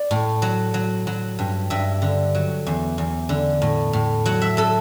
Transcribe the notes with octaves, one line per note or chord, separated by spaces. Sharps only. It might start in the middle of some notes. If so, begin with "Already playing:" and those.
Already playing: D5
A2
F#3
F#3
F#3
G2
G2 E5
D3
F#3
E2
E2
D3
A2
A2
F#3 F#5
E5
F#3 A4